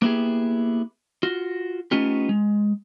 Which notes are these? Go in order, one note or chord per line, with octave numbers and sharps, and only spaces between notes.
A#3 B3 E4 G4 G#4
F4 F#4
A3 B3 C#4 D#4 F4 G4
G#3